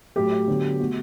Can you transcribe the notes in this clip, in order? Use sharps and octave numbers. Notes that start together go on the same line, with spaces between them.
A2 F#3 A3 G4
D3 F#3 B3
B2 A3 F#4